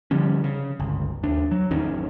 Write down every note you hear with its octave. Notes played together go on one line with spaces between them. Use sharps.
D3 F3 G3 C#4
C#3
G1 C#2
D#2 D4
F#3
G#1 E2 D#3 C#4